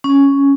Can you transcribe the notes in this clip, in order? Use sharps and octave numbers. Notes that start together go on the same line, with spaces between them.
C#4